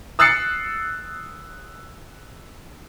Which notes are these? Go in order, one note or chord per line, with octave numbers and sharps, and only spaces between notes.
D#6 E6 F#6 A6 C7 C#7